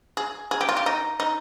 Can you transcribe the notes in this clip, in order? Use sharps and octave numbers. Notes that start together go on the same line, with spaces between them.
G#4
G#4
G4
F4
G4
D#4
D#4